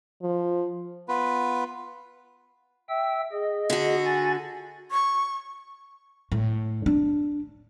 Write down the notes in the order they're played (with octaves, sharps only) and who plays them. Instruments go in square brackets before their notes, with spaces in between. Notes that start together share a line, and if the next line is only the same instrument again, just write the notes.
[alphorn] F3
[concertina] B3 F4 B4
[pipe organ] E5 G5 E6
G#4 D#5
[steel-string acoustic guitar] D3 F#4
[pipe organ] G#5 A6
[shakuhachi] C#6
[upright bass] A2
D4